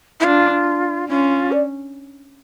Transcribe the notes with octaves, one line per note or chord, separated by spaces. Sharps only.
E4
D4 F4
C#4 F4
D5